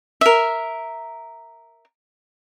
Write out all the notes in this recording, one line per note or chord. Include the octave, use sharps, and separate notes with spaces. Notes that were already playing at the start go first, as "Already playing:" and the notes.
A#4 E5